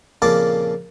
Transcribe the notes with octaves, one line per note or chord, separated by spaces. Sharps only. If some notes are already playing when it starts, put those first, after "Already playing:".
F2 A#2 C#3 A#3 A5 D6